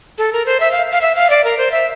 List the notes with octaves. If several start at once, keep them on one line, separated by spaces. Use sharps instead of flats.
A4
A#4
C5
E5
F5
F5
E5
F5
D5
A#4
C5
E5